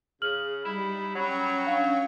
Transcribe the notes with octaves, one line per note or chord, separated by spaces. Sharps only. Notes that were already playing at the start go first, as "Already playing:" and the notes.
C#3 G#4 F6 F#7
G3 D#4 E4 B5
F#3 C#4 G5 C#6
D4 F5